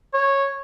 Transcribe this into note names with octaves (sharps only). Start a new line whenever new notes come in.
C#5